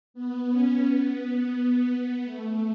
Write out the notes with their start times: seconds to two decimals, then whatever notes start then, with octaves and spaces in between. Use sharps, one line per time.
0.14 B3
0.49 C#4
0.84 B3
2.25 A3